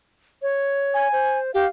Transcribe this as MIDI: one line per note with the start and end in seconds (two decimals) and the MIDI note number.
0.42 1.08 73
0.94 1.39 80
1.13 1.54 72
1.54 1.65 67
1.54 1.68 77